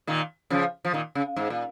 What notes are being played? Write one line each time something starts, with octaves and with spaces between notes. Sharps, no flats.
A#2 D#3
C#3 F3
F3
A#2 D#3
C#3
G#2
A#2